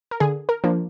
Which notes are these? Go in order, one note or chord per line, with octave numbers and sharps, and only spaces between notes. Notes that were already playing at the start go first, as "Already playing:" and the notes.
A#4
D3 G#4
A#4
F3 A#3 D4